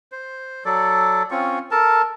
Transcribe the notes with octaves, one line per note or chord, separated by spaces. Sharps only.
C5
F#3 A4 D5
C4 C#4 F4 C#6
A4 A#4 A5